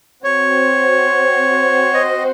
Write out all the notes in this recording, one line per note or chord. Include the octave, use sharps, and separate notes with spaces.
C4 F#4 C5 C#5
D#5